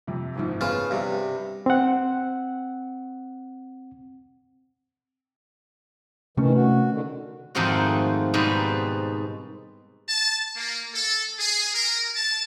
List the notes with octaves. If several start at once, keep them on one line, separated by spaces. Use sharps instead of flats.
F2 C3
F#1 G#2 F3
C#3 B3 F4 G#4 A5
G2 C3
C4 F#5
C3 D#3 E3 A3 C#4
F#4
D3 D#3
F2 G#2 D#3 A3 C4 F#4
G#2 B2 G3 C4 B4
A5
A#3
A4
G#4
A#4
A5